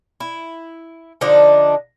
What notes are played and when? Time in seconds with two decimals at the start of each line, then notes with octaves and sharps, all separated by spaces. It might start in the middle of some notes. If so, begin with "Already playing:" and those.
0.20 E4
1.21 D3 F3 D4 D#4